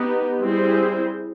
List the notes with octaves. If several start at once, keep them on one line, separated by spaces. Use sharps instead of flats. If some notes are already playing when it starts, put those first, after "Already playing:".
Already playing: B3 D#4 G4
G3 C4 E4 G#4 C5